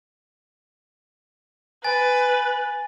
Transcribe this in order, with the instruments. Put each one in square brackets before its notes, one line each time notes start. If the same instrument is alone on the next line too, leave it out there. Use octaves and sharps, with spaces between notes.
[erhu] B4 [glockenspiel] G#5 A6